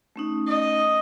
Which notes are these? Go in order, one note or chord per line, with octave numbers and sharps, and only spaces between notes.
A3 C#4 D#4
D#5